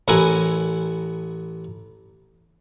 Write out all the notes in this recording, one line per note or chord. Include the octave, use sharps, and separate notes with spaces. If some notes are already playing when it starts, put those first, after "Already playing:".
A1 E4 A#4 F#5 G#5